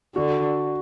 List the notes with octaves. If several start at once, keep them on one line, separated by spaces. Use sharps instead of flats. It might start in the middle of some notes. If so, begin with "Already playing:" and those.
D3 F#4